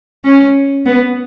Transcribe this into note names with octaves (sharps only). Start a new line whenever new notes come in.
C#4
B3